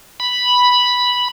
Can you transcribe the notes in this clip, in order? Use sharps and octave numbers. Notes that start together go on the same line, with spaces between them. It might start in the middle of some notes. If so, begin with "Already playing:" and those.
B5